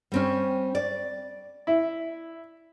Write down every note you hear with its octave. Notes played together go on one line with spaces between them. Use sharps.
G3 C4 C#4
D5
E4